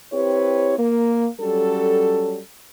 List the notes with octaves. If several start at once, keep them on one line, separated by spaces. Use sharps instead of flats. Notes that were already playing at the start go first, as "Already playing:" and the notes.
C4 E4 G4 B4 C#5
A#3
F#3 G3 C#4 A4